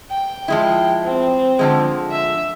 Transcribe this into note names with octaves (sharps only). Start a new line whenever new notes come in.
G5
F3 G#3 E4
C4
D3 F3 G#3
E5